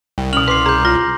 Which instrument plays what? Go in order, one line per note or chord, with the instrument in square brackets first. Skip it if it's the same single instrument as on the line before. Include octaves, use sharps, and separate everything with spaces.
[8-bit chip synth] C2 [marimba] G5
[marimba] B2 C#4 [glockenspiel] F6 F7 F#7
[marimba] B4 [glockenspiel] C6 D6 C7
[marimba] G#4 [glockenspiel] A#5 D6 G6
[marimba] F4 [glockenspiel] A#6